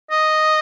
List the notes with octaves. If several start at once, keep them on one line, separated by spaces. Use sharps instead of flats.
D#5